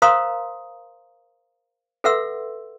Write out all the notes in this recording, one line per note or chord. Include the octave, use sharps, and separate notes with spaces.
A#4 C5 F5 A#5 C6 D#6
A4 B4 E5 F#5 C6 E6